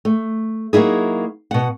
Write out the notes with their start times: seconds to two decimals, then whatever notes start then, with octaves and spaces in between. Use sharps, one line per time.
0.05 A3
0.73 F#3 A#3 D#4 E4 G#4
1.51 B2 F#5